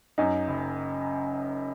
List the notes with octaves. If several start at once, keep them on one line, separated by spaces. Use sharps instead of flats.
F#2 D#4
F#1